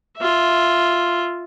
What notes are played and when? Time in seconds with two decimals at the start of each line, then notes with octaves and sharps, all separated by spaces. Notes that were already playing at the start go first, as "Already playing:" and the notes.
0.18 F4 E5